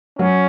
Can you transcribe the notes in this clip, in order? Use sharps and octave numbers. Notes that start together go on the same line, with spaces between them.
F#3 C#4